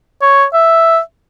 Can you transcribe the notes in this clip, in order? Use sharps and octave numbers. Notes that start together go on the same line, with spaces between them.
C#5
E5